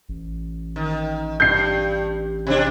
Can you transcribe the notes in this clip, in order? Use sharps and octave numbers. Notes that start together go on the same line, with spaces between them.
A1
D#3
G2 G6 C7
C3 D4